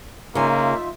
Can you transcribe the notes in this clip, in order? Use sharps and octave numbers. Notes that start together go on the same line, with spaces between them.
C#3 A#3 D#4 F4 E5 G#5